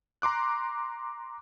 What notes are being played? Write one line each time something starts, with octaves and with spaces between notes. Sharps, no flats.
A#5 C6 D6 F#6